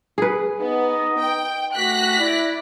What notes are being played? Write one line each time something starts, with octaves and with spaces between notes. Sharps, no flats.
G#4 B4
B3 D#4 D#5
G5
A3 F#4 G4 F#6 A#6 B6
E4 D5